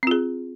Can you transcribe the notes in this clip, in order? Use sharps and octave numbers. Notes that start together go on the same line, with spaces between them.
C4 F4 G#4